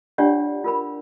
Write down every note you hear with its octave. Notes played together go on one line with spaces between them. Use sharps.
D4 F4 G4 C#5 D5 F#5
F4 A#4 B5